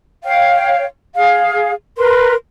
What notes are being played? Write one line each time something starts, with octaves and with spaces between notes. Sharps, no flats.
C#5 F5 G5
G#4 F5
A#4 B4 C6